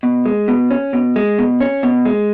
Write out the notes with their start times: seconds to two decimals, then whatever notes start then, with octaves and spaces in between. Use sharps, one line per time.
0.03 B2
0.26 G#3
0.48 B2
0.71 C#4
0.93 B2
1.16 G#3
1.38 B2
1.60 C#4
1.83 B2
2.05 G#3